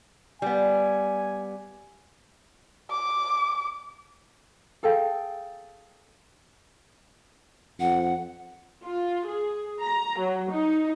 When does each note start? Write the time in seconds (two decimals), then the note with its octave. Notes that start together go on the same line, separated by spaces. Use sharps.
0.42 G3 B3 G#5
2.91 D6
4.83 G#4 A4 F5 G5
7.80 F2 F#5
8.85 F4
9.27 G#4
9.82 A#5
10.19 F#3
10.51 D#4